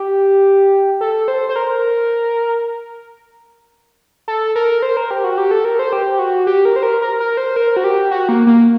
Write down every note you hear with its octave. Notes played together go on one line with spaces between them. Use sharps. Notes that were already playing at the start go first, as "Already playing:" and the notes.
Already playing: G4
A4
C5
C5
A#4
A4
A#4
C5
A#4
G4
F#4
G4
A4
A#4
C5
G4
F#4
G4
A#4
C5
A#4
A#4
A#4
C5
A#4
F#4
G4
F#4
A#3
A#3